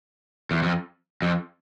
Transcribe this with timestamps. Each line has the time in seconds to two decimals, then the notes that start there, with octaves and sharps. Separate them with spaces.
0.51 E2
0.63 F2
1.22 F2